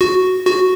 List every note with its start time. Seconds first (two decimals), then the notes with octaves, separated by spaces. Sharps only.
0.01 F#4
0.47 F#4